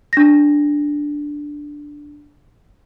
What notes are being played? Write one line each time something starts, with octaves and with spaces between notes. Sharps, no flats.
D4 A#6